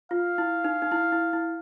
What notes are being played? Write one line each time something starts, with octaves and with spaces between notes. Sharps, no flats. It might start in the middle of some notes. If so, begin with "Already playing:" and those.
F4 F5
E4
D#4
D#4
E4
E4
E4